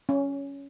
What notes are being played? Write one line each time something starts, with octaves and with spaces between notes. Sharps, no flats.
C#4